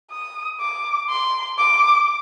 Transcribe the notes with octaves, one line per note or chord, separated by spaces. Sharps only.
D#6
D6
C6
D6